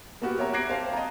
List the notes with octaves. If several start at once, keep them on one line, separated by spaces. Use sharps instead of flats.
A#3 B3 F#4 G4
G4 C#5 E5 A#5
D6 F#6 G#6 A#6 C7 D7
C5 F5 G5 A5
D#5 A5 A#5